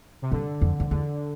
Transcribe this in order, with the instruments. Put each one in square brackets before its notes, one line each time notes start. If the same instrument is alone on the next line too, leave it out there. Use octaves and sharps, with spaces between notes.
[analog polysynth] C3
[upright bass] G2 [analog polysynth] D3
[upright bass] F2
F2
[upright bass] E2 [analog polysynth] D3